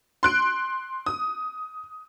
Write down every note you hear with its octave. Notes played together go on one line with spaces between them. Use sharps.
C6 F#6 D7
D#6